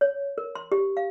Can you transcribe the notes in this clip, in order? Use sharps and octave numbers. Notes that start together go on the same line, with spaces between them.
C#5
A#4
C6
G4
F5